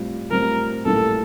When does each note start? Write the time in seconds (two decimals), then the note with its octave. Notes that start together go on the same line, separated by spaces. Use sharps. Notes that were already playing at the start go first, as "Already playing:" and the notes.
Already playing: A2 G3 C4 F4
0.31 A2 G3 C4 F4 A#4
0.85 A#1 A2 G3 A#3 E4 A4